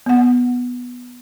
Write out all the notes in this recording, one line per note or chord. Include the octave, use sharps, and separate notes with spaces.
B3 F#5